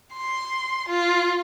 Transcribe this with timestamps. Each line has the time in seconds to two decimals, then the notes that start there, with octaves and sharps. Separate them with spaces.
0.13 C6
0.88 F4